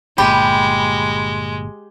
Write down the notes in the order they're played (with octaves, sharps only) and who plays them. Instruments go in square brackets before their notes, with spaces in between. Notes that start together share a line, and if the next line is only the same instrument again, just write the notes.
[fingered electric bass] G1 A#2 [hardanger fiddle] G#3 [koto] G4 [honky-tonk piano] B5